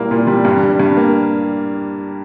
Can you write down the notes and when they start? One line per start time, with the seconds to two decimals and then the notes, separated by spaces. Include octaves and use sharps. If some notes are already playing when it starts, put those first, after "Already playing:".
Already playing: A#2 G3 A#3 E4
0.11 A#2
0.27 G3
0.45 G2
0.63 G3
0.80 G2
0.97 A#3